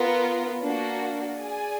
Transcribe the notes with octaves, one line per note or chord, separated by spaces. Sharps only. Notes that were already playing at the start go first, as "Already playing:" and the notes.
Already playing: B3 F4 A#4
A#3 D4 F#4
G#4 D5 G#5